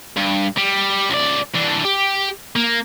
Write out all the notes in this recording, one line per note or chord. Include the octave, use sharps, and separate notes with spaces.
G2
G3
C#2 D5
E3 D4
G4
A#3